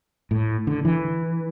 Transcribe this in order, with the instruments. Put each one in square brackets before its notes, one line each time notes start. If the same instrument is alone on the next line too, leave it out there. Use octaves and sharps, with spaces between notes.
[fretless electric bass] A2
D3
E3